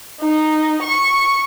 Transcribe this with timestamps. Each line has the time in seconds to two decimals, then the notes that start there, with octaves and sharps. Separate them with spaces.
0.21 D#4
0.83 C#6